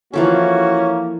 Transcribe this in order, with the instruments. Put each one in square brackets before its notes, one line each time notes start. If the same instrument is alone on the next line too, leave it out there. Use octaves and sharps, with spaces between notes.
[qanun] E3 F3 A4 [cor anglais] A#3 [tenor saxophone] C#4 [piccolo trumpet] F#4